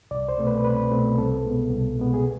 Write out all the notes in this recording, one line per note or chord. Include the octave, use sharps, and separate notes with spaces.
C2 D5
C5
B2 A3 C4
B4
C2 B4
B2 A3 C4
C2 A4
B2 G#3 B3
C2
B2 G#3 B3
G#4